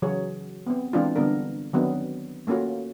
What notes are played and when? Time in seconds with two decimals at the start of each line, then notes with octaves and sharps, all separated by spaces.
0.02 C#3 E3 F#3 F#4 G#4 C#5
0.67 B3 C4
0.93 E3 G#3 C4 D4 E4 F4
1.16 D3 G3 B3 D4 A#4
1.73 D#3 F#3 B3 C4 D4 A#4
2.47 A3 A#3 C#4 F4 F#4